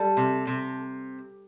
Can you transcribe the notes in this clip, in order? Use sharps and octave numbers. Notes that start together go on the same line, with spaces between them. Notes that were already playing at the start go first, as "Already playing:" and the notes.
Already playing: G3 A4
C3
C3